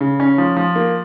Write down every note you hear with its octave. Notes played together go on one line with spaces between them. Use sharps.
C#3
C#4
F3
F3
A#3